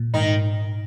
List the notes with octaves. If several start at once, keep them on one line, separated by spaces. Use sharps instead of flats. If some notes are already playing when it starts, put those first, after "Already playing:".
Already playing: A#2
G#2 D#3 D#4